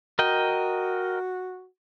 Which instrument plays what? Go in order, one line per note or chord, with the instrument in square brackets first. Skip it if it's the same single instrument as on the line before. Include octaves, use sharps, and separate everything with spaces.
[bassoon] F#4 [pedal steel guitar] A#4 D#5 G5